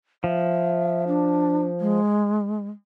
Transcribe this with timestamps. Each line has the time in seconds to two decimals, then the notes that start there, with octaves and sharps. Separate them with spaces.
0.24 F3 E5
1.07 D4
1.80 G#3